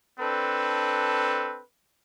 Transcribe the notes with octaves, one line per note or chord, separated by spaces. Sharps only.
C4 D4 A4 B4